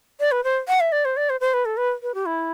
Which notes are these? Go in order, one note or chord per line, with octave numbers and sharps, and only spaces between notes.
D5
B4
C5
F#5
E5
D5
C5
D5
C5
C5
B4
A4
B4
B4
G4
E4